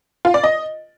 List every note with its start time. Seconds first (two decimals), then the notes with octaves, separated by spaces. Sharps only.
0.25 F4
0.34 D5
0.44 D#5